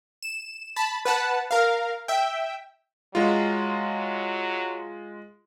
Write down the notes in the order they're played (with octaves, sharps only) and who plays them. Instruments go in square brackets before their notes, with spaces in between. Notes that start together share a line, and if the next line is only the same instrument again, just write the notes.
[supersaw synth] E7
A5 B5
B4 F#5 A5
A#4 F5
E5 G5
[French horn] F#3 [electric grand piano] G#3 F4